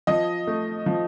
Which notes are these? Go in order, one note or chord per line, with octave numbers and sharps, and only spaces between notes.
F3 D#5
A3
F3